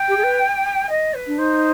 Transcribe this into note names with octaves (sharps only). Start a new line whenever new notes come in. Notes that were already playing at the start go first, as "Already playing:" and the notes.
Already playing: G5
G4
G#4
B4
D#5
B4
D4
D#4 C5